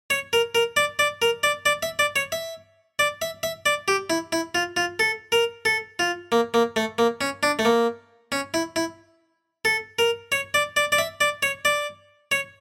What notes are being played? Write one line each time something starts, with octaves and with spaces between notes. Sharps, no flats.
C#5
A#4
A#4
D5
D5
A#4
D5
D5
E5
D5
C#5
E5
D5
E5
E5
D5
G4
E4
E4
F4
F4
A4
A#4
A4
F4
A#3
A#3
A3
A#3
C#4
D4
A3
A#3
C#4
E4
E4
A4
A#4
C#5
D5
D5
D5
E5
D5
C#5
D5
C#5